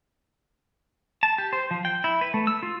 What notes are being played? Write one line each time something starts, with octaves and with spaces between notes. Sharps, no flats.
A5
G4
C5
F3
G5
E4
B4
A3
E6
F4